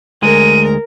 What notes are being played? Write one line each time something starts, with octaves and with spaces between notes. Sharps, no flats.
D2 G#3 A#4 D#7